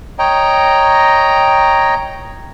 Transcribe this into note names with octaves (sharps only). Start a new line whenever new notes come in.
C#5 D#5 G5 A#5